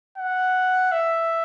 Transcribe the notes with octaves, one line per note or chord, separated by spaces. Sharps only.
F#5
E5